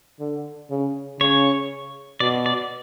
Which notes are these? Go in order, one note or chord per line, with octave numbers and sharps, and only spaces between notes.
D3
C#3
C#3 C#5
B2 D5
D5